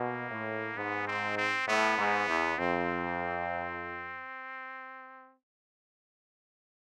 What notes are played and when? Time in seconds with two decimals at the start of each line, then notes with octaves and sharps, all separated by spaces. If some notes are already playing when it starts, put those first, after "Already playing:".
Already playing: B2 A#3
0.31 A2
0.76 G#2 B3
1.07 C4
1.37 C4
1.68 A2 B3
1.98 G#2
2.28 E2
2.58 F2 C4